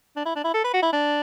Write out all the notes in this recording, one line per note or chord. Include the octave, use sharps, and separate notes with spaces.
D4
E4
D4
E4
A4
B4
F#4
E4
D4